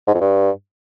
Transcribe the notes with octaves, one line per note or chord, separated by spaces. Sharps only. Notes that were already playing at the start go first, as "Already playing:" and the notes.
G#2
F2
G2